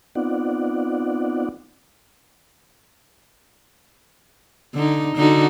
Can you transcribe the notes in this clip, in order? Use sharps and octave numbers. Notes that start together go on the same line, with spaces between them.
B3 C4 D#4 F4 D5 F#5
D3 D#4
D3 D#4 F#4